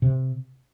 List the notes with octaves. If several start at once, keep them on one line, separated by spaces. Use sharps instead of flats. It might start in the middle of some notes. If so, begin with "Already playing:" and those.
C3